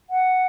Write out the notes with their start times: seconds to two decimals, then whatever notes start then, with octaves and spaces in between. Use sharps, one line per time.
0.10 F#5